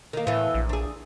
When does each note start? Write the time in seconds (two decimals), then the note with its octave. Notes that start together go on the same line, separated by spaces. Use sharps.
0.13 D#3 A#3
0.27 A2 E3 B3
0.54 A#1
0.69 D4 G#4